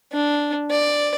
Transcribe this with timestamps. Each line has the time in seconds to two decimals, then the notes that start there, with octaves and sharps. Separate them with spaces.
0.12 D4
0.71 D5